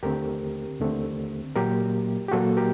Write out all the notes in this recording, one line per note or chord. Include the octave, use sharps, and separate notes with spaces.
D#2 D3 A3 C4 G4 A#4
D#2 D3 A3 C4
A#2 F#3 A#3 G4 A#4
G4
A#2 F#3 A#3 F#4 A4
G4 A#4